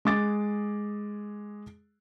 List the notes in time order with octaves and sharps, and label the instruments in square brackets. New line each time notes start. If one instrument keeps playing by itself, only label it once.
[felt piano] G#3 G#4 D6 A6